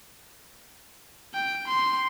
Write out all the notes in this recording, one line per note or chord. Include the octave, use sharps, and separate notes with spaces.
G5
C6